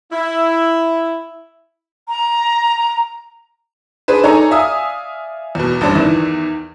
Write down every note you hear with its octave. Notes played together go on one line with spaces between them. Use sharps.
E4
A#5
D4 G#4 B4 C5
D#4 A4 C#5 D5 G#5 A#5
D5 E5 F5 G#5 D#6 E6
E2 B2
A1 G2 D4 C5 E7
E2 D#3 E3